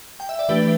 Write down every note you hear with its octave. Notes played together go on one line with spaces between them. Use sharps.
G5
E5
D5
E3 A3 D4 G4 B4